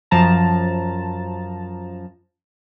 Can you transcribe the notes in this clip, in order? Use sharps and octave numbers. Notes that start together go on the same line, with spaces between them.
F#2 F3 A5 A#5